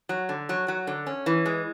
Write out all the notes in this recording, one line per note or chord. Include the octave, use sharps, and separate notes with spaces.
F#3
D3
F#3
F#3
D3
C#4
E3
G#3